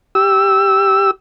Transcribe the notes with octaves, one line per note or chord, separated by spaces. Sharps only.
G4 E6